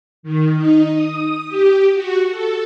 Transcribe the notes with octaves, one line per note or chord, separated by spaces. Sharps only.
D#3
D#4
D#6
G4
F#4
A4